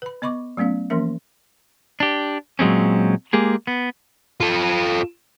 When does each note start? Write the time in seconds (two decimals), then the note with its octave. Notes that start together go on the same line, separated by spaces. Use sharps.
0.02 B4 B5
0.22 B3 D#5 B5 C#6 D6
0.57 F#3 A3 B3 C#4 F5
0.90 E3 F3 A#3 C#4 A#4 E5
2.00 D4 G4
2.59 A#2 F#3 G#3 C4 C#4
3.33 G#3 A#3 G4 G#4
3.67 B3
4.41 F4 A4